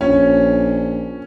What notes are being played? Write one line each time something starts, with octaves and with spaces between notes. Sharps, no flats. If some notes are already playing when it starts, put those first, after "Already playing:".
A#1 C#4